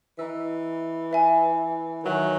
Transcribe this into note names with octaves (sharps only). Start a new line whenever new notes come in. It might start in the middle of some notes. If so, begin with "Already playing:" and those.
E3 D#5 A#5 E6
B4 E5 G#5
D#3 F#3 B4 E5 G#5